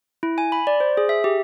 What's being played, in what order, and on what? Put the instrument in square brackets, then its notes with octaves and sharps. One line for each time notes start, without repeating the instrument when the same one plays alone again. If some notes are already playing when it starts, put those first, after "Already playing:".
[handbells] E4
G#5
B5
D5
C5
G#4
E5
G4